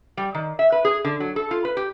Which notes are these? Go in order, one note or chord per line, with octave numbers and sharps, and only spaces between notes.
G3
D#3
E5
B4
G#4
D3
F#3
A4
F4
B4
G4